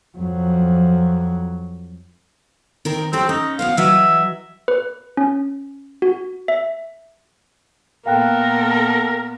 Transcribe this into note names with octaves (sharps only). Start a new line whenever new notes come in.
F2 F#3
D#3 C4 A#4
C4 C#4 G4 A4
C#4 D#4
F#3 B3 C5 F5
E3 F#3 D#5 E5
B4
C#4
F#4
E5
A#2 B3 A4 A#4 F5 G5 F#6